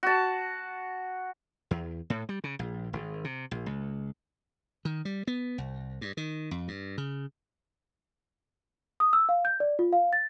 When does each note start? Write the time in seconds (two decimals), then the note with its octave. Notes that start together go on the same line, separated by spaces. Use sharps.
0.03 F#4 A5
1.71 E2
2.10 A2
2.29 G3
2.44 C#3
2.59 A#1
2.93 G#1
3.25 C3
3.51 A#1
3.66 C#2
4.85 D#3
5.05 G3
5.27 B3
5.58 C2
6.01 G2
6.17 D#3
6.51 F2
6.68 G2
6.98 C#3
9.00 D#6
9.13 E6
9.29 F5
9.45 G6
9.60 D5
9.79 F4
9.93 F5
10.13 A6